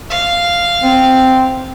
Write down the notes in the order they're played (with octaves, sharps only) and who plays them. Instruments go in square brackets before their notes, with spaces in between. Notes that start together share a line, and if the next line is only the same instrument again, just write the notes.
[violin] F5
[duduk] C4